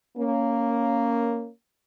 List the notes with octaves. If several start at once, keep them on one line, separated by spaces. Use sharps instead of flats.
A#3 C#4